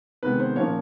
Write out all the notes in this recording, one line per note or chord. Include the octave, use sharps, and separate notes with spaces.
C3 D#3 G#3 B3 B4
C5
A#2 F3 A#3 C#4 C#5